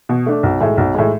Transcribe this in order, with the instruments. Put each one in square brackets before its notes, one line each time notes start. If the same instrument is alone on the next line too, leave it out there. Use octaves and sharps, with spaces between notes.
[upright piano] B2
A3 D4
B1
A2 G#3
B1
A2 G#3